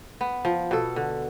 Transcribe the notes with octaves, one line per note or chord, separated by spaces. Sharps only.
B3
F3
B2 A4
D3